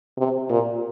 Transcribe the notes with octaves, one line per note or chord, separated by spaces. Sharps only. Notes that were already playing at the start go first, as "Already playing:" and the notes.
C3
A#2